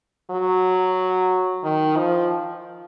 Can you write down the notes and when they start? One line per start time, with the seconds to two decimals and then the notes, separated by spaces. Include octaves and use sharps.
0.30 F#3
1.63 D#3
1.96 F3